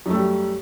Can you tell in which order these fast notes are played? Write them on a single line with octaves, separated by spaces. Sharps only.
F#2 A3 G3